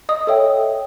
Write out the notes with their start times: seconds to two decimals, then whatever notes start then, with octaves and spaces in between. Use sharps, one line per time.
0.09 D#5 D#6
0.27 A4 C#5 E5 G5